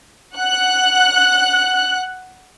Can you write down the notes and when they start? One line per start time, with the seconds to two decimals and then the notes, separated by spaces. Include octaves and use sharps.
0.35 F#5 F#6